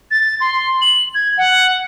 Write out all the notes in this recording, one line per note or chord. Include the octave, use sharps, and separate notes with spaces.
A6
C6
F#7
G#6
F#5